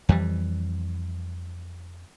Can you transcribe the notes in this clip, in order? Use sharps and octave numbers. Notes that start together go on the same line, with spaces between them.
F2 E3 G3